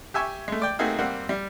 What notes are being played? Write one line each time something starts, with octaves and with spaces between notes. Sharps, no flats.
G4 E5 G#5 C#6
G#3 A3
D5 G5
A3 A#3 C4 D#4 F#4 G#4
G3 A#3 C4 F#5
G3